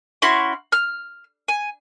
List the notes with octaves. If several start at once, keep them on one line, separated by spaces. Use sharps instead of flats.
C#4 E4 F#4 C6
F6
G#5